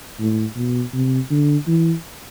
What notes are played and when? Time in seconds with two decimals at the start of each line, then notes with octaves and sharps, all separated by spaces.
0.19 A2
0.56 B2
0.94 C3
1.31 D3
1.67 E3